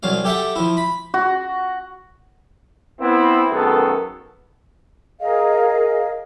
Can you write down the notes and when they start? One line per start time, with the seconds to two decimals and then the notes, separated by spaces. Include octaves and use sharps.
0.03 C2 F#3 F5
0.24 G4 A4 E5 F#5 G5
0.56 F3 E4
0.77 B5
1.14 F#4
3.01 B3 C4 E4
3.51 F#2 D#3 A3 B3 G#4 A4
5.20 G#4 A#4 D#5 F5